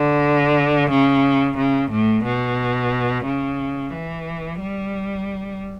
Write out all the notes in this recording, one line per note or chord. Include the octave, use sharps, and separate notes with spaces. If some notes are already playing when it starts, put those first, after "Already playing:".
Already playing: D3
C#3
C#3
A2
B2
C#3
E3
G3